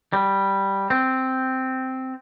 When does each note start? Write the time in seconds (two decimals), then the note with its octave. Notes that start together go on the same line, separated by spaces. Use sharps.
0.13 G3
0.90 C4